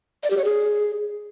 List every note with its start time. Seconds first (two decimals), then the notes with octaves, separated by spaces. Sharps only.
0.23 D5
0.30 G4
0.37 C#5
0.44 G#4